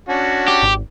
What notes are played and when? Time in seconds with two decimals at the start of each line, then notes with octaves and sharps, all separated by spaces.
0.09 C#4 D4 F#4
0.48 G4
0.63 G#1